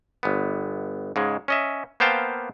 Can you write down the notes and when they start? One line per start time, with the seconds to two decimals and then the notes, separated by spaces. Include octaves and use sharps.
0.23 G1 B3
1.16 G#2 C#3 G#3
1.48 C#4 D#5 E5
2.00 A#3 B3 C5 F5 G5 A5